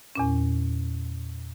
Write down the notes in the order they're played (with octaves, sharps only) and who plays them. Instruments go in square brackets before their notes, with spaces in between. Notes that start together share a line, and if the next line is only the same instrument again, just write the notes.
[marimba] E2 A#2 C#4